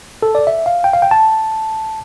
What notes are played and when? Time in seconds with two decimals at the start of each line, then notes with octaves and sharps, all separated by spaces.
0.22 A4
0.35 D5
0.47 E5
0.66 F5
0.84 G5
0.93 F5
1.02 G5
1.11 A5